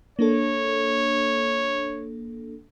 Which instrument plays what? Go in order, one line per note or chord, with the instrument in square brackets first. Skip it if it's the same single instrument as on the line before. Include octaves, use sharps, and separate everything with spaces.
[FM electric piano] A#3 D4 A4 [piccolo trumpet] C#5